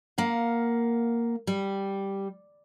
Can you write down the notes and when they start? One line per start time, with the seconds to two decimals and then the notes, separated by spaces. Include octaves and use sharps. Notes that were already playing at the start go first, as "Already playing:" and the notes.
0.18 A#3 F5 F#5
1.47 G3